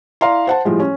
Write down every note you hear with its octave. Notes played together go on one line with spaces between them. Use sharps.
E4 D5 F5 A#5 C6
C5 F#5 A5
A2 F3 G3 G#3
C#4